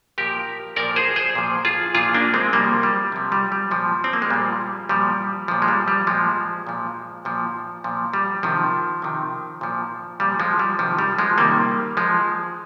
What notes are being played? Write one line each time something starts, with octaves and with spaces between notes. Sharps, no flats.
A#2 F3 G4 A#4
A#2 F3 A#4 D5
G#4 C5
G#4 C5
A#2 F3
F4 G#4
A#2 F3 F4 G#4
A#3 D4
G#3 C4
C3 F3 G3 A#3
G3
C3 F3
G3
G3
A#2 F3
C4
A#3
G#3
A#2 F3 G3
A#2 F3 G3
A#2 F3
G#3
G3
G3
A#2 F3 G#3
A#2 F3
A#2 F3
A#2 F3
G3
C3 D#3 F3
C3 D#3
A#2 F3
A#2 F3 G3
F3 G#3
G3
C3 D#3 F3
G3
F3 G#3
C3 D#3 G3 A#3
F3 G#3